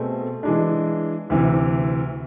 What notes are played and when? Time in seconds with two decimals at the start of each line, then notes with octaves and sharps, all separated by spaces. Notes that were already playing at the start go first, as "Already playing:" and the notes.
Already playing: B2 A3 C4 G#4
0.43 E3 G#3 D4
1.30 D2 C3 E3